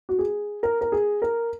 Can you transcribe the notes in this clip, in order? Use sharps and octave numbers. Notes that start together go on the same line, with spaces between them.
F#4
G#4
A#4
A#4
G#4
A#4